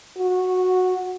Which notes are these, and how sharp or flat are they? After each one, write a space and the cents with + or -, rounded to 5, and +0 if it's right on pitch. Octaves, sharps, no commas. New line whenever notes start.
F#4 -10